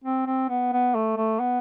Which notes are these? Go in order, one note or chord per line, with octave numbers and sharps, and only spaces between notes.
C4
C4
B3
B3
A3
A3
B3